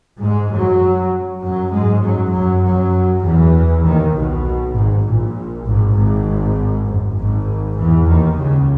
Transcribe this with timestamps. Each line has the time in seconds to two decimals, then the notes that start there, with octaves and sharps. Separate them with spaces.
0.21 G#2 G#3
0.51 F#2 F#3
1.42 F#2 F#3
1.73 G#2 G#3
2.03 F#2 F#3
2.33 F#2 F#3
2.63 F#2 F#3
3.24 E2 E3
3.85 D#2 D#3
4.15 B1 B2
4.75 G#1 G#2
5.05 A#1 A#2
5.67 G#1 G#2
5.96 G#1 G#2
6.87 F#2
7.18 G#1 G#2
7.78 E2 E3
8.08 D#2 D#3
8.38 C#2 C#3